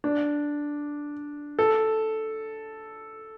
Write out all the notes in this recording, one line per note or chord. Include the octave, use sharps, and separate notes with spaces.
D4
A4